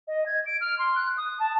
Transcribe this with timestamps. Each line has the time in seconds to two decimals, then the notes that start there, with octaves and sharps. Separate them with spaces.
0.08 D#5
0.26 G#6
0.46 D7
0.61 F6
0.79 C6
0.95 F#6
1.18 D#6
1.40 A5